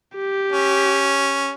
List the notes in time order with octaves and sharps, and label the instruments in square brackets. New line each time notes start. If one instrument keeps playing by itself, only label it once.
[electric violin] G4
[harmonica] C#4